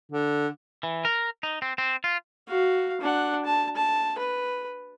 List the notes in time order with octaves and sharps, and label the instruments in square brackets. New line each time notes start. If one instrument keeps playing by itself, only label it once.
[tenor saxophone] D3
[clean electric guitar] E3
A#4
D#4
C4
C4
F4
[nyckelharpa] F#4 F5
D4 F#5
A5
A5
B4